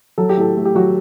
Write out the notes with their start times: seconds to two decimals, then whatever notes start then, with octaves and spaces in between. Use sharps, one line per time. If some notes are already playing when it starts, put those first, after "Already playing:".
0.18 F#3 A4
0.29 G4
0.37 A2 A4
0.56 A3
0.65 G4
0.75 F#3 F#4